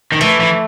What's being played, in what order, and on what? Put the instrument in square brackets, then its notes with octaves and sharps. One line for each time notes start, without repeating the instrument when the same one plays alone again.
[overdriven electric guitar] D#3
[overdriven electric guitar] E3 [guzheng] A3
[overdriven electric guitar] E3